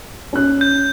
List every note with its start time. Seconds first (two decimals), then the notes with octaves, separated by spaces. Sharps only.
0.33 C#4 F#6
0.61 G6